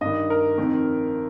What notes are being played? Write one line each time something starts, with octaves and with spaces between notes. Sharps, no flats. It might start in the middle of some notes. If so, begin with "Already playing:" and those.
G2 D#3 D#5
A#4
F2 D#3